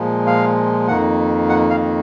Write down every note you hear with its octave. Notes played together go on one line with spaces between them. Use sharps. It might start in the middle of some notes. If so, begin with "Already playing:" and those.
Already playing: A#2 F3 G#3
F5
F2 D#3 A#3 F#5
F#5
F5